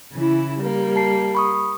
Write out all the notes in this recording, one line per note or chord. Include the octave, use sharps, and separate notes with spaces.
C#3 E3 E4
G3 A#3
A5 C7
B5 C#6 D#6